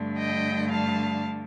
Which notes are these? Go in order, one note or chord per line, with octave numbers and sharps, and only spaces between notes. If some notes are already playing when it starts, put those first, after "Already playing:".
Already playing: G2 D3 A3
D#5 G5
F5 A5